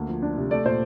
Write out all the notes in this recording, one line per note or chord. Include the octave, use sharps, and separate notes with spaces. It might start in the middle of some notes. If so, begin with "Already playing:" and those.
Already playing: D2 A#3
F3
D4
C3
A3 D5
A#2 C5